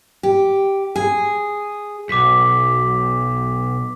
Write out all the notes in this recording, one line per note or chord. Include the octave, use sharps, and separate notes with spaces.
G4
G#4
B1 D6 B6